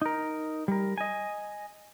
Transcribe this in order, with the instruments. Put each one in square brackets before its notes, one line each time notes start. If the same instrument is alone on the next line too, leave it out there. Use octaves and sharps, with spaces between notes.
[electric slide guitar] D#4 A#4
G3 A#4
D#5 G#5